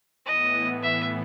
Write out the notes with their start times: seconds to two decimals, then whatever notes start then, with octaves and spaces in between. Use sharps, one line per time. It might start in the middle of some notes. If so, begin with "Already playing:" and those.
0.25 A2 E3 B3 D#5
0.83 E5